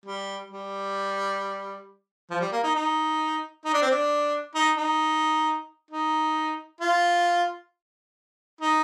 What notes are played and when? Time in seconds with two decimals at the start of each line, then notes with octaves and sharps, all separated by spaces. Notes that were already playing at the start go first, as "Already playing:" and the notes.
0.05 G3
0.50 G3
2.30 F3
2.41 G3
2.52 A#3
2.64 D#4
2.75 D#4
3.65 D#4
3.73 D4
3.82 C4
3.91 D4
4.55 D#4
4.77 D#4
5.91 D#4
6.80 F4
8.61 D#4